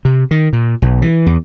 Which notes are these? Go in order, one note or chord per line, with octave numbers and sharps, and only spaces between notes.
C3
D#3
A#2
B1
E3
E2